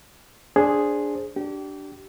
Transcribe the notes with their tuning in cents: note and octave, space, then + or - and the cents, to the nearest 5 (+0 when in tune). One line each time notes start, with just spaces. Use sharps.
D4 -5 G#4 +0 C5 +15
D4 +0 G4 -30